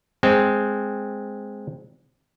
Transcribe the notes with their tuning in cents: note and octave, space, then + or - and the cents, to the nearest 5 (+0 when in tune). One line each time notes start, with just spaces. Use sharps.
G#3 +0 C4 +0